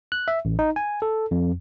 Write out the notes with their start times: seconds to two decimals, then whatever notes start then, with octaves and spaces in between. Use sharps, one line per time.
0.12 F#6
0.28 E5
0.45 A1
0.59 D#4
0.76 G#5
1.02 A4
1.31 F2